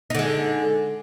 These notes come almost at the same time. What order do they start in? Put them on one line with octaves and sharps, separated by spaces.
D#4 D3 G#3